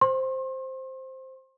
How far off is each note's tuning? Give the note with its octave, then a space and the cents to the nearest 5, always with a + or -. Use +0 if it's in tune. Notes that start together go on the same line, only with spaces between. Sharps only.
C5 +5 C6 +40